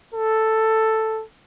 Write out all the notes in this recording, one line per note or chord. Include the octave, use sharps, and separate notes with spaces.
A4